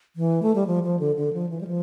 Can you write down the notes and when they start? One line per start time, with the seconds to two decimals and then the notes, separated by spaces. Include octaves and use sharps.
0.16 E3
0.42 A3
0.55 G3
0.67 F3
0.84 F3
0.99 D3
1.16 D3
1.33 F3
1.49 E3
1.61 G3
1.67 F3